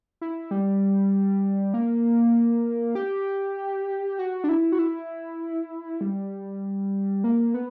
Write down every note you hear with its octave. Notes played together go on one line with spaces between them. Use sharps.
E4
G3
A#3
G4
F#4
D4
E4
F#4
E4
G3
A#3
B3